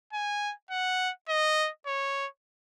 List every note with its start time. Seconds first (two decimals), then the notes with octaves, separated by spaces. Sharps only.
0.13 G#5
0.71 F#5
1.29 D#5
1.87 C#5